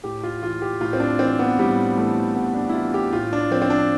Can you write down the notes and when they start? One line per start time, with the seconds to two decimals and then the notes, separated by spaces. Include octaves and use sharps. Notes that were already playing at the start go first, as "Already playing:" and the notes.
0.04 A2 G4
0.23 F4
0.42 E3 F4
0.62 G4
0.81 A2 F4
0.93 C4
1.00 D4
1.19 E3 C4
1.39 B3
1.59 A2 G3
1.97 E3 A3
2.35 A2 B3
2.54 D4
2.69 E4
2.74 E3 F4
2.94 G4
3.13 A2 F4
3.33 D4
3.51 F3 C4
3.62 C4
3.70 D4